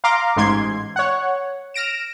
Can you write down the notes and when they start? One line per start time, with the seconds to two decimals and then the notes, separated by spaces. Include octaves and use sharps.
0.04 F5 A#5 C6 D6
0.36 A1 G#2 C6 G#6
0.96 C#5 F#5
1.74 F6 A#6 D7 E7